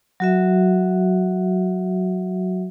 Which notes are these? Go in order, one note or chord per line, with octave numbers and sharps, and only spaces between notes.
F#3 F#4 E5